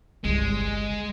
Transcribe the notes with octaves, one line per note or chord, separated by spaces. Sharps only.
G1 C2 G#3